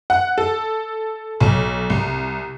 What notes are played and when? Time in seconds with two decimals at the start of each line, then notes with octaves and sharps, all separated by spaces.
0.10 F#5
0.38 A4
1.40 B1
1.90 C2